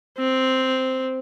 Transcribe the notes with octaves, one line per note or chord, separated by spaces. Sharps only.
C4